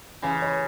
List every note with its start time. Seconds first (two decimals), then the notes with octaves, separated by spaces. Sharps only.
0.22 C#3 E3 G#5
0.42 C#5